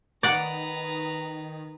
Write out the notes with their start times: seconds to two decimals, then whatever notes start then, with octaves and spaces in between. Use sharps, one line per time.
0.23 D#3 B4 D5 F#5 A#5